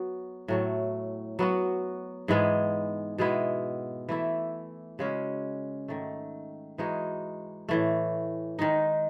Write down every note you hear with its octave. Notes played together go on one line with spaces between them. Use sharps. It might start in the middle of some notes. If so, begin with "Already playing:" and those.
Already playing: F#3 B3 F#4
A2 F#3 A3
F#3 B3 F#4
G#2 E3 G#3 B3
B2 G#3 B3 E4
E3 A3 E4
C#3 G#3 C#4 F#4
G#2 D#3 A3
E3 G#3 D#4 F#4
A2 E3 A3
D#3 G#3 D#4